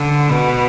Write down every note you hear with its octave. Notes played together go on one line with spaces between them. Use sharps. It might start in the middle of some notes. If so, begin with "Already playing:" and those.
Already playing: D3
B2